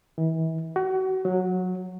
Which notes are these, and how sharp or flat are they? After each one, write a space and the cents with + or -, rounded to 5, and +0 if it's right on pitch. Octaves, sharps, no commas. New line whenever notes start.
E3 -35
F#4 +30
F#3 -15